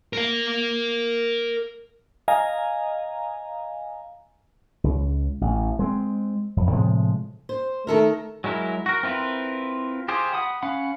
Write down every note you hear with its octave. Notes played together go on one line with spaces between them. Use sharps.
A#4 F5
D#5 F5 G#5 A#5
C#2
A1
G#3 C4
F2
A2 C3 F3 G#3
C5
D#3 A3 A4 A#4
F#3 G#3 E4 A#4
F#4 A#4
C4 E4 F4 A#4 B4
F4 G4 G#4 C5
F#5 B5 D#6
C#4 F5 F#5 B5